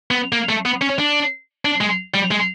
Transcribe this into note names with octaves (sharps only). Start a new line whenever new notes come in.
B3
A#3
A3
B3
C#4
D4
D4
G#3
G3
G#3